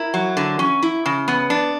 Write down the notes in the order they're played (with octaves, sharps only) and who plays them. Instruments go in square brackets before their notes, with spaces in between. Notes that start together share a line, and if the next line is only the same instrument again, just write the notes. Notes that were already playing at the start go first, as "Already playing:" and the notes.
Already playing: [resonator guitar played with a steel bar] E4 A#4
F#3
D3
C#4
E4
C#3
B3
D4